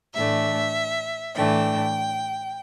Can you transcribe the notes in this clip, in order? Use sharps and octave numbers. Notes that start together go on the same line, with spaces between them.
A2 E3 A3 D4 E5
A2 E3 A3 D4 G5